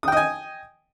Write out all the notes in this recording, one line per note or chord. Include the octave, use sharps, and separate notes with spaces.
D#5 G5 G#5 D#6